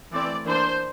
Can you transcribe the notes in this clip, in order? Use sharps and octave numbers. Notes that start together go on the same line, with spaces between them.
E3 A3 C4 D5
E3 A#3 D4 C5